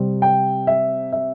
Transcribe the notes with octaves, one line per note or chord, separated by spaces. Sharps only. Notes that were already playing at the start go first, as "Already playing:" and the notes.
Already playing: C3 G3 C4
G5
E5
E5